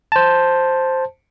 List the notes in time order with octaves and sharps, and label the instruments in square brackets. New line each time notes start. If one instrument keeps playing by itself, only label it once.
[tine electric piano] C5 A5